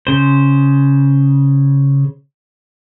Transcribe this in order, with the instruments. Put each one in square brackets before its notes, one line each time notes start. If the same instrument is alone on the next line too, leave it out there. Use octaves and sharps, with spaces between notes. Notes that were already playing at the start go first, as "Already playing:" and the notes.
[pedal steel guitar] C#3 C5